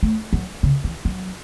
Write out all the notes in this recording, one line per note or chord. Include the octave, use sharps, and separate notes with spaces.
A3
F#3
C#3
E3
F#3